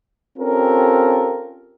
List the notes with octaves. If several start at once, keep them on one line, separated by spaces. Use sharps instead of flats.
C4 C#4 F4 G4 A4 A#4